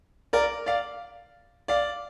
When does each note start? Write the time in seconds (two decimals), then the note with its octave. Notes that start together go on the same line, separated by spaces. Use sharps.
0.33 A#4 D5
0.66 D5 F5
1.68 D5 F5